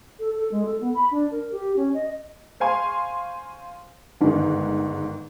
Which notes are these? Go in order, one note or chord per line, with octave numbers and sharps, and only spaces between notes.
A4
A4
G#3
A4
B3
B5
D4
A#4
G4
C#4
D#5
C5 F5 G#5 C6 C#6
G1 G#2 D#3